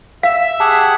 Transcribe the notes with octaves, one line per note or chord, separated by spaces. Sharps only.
E5 F5 B6
G4 G#4 F#5 A5